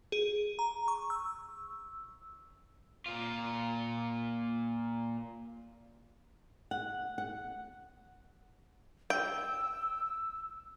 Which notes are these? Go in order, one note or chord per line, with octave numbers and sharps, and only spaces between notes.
G#4
A#5
C#6
E6
A#2 F4
F#5
F#5
G5 E6